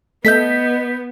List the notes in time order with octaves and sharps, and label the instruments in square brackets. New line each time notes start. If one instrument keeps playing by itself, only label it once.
[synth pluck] A3 A4 E5 [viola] B3 [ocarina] D#5 [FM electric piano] G6 B6